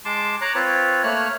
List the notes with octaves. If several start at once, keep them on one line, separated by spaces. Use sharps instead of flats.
G#3 A5 C6 D6
C#5 A#5 D6 F#6
C4 F4 B4 C#5
A3 A#3 C#5 F6 F#6